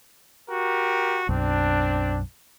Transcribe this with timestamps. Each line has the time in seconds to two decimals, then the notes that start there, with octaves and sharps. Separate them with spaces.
0.49 F#4 G4 A#4
1.29 B1 F#2 C4 D4